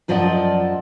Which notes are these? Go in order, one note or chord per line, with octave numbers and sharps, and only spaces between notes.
F#2 F3 D5 D#5 F#5 A5